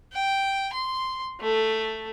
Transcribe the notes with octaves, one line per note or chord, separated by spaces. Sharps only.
G5
C6
A3